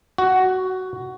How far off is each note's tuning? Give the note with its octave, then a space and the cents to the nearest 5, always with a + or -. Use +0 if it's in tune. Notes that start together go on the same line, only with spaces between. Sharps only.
F#4 +10